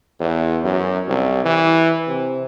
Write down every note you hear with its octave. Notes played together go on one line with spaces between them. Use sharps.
E2
F#2
C2
E3
C3